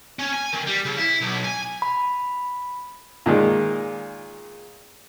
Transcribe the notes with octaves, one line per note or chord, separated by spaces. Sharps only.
C#4
G#5
D#3
G3
C#3
E4
B1
G#5
B5
A#2 D#3 G#3